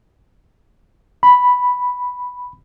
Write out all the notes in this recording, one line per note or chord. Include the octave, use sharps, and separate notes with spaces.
B5